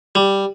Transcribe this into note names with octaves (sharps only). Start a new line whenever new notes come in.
G3